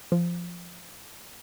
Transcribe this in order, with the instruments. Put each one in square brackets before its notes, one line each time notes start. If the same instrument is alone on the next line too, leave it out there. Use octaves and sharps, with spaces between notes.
[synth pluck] F3